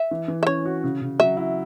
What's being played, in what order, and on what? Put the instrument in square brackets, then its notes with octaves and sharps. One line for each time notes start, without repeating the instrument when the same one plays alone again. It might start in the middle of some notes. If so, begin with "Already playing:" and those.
Already playing: [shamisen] E5
[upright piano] E3
E3
[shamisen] E5
[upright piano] C#4 [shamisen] C#5
[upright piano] F#4
C#3
C#3
[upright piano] F#3 [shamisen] E5
[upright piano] E4